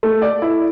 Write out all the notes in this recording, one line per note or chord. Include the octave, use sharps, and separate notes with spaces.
A3
D5
E4